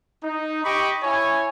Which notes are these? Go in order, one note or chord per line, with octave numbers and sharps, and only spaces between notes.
D#4
G4 D#5 G5 B5 C#6 D6
E4 C#5 G#5